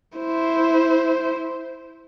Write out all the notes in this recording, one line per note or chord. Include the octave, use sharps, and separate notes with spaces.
E4 C5